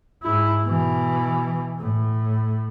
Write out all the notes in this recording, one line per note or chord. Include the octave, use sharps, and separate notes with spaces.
G#2 E4
B2 E3
A2